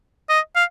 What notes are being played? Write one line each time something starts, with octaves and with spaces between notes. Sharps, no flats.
D#5
F5